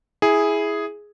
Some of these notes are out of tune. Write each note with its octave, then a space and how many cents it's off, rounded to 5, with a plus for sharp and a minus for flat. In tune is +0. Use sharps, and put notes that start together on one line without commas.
E4 -5 G#4 +0